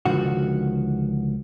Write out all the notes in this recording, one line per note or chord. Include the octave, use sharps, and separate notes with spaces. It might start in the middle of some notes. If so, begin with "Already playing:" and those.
C#2 D3 D#3 F3 F#4